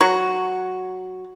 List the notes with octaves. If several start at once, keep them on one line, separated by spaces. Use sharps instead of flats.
F#3 F#4